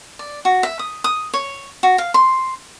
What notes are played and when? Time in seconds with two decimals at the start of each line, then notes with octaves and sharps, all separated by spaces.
0.19 D5
0.45 F#4
0.63 E5
0.79 D#6
1.04 D#6
1.34 C#5
1.83 F#4
1.98 F5
2.14 C6